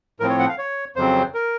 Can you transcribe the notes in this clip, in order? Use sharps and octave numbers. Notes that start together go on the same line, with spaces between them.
A2 F3 C4 A#4
C#5
F#5
F5
C#5
F2 C#3 F#3 C4 C5
A#4